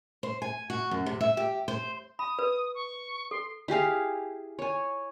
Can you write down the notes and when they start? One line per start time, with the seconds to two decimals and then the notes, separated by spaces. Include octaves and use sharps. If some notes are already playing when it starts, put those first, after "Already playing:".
0.23 C5
0.42 G#5
0.70 F#4
0.91 F#2
1.06 C3
1.21 E5
1.37 G4
1.68 C5
2.19 B5 D#6
2.39 B4
2.75 C#6
3.31 A4 C6
3.68 E4 G4 G#4 F5
4.59 C#5 G#5